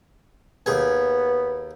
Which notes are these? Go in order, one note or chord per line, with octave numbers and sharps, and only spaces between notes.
D#2 B3 G#4 G#5